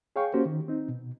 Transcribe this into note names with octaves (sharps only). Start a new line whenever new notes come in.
G#4 C#5 F5 G5 C#6
A#3 C#4 F#4 G4 C5
D#3
C4 D#4
B2